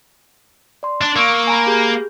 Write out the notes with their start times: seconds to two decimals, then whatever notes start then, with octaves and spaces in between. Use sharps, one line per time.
0.83 D5 C6
1.01 D4
1.16 A#3 C#6 E6 C#7
1.47 G#5 A#5 B5
1.66 G4 G#4 G6